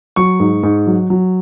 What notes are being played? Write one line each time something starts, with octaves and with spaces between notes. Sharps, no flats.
F#3 C#6
G#2
G#2
F#3
F#3